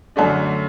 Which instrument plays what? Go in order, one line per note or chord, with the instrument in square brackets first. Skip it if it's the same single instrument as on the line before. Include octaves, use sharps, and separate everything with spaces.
[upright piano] F#2 D3 A3 D4